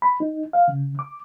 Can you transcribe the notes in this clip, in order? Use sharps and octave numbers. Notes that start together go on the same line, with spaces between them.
B5
D#4
F5
C#3
D6